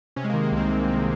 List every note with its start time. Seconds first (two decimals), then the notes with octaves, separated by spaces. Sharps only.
0.16 C3 C#4
0.24 G#3
0.29 D#3 A#3
0.43 A#3
0.52 C2 C4
0.70 C3
0.89 C3